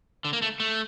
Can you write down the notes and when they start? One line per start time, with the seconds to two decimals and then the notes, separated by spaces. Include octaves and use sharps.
0.25 D3
0.33 A#3
0.42 A3
0.60 A3